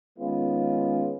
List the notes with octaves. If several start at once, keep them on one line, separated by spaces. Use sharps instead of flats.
D#3 G#3 B3 C#4 F4